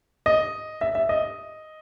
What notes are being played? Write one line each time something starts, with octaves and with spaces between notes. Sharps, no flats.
D#5
E5
E5
D#5